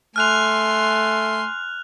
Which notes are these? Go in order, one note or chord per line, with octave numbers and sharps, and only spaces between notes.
A3 G#5 C6 F6 F#6 F7